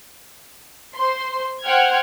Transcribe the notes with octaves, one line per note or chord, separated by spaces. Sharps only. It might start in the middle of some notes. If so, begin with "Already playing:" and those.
C5 C6
C5 F#5 G5 F6 G#6